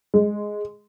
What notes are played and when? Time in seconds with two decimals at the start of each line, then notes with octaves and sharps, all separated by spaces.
0.14 G#3